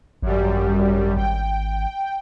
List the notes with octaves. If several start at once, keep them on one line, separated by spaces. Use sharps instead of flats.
G#1 F#2 G3
G#1 G5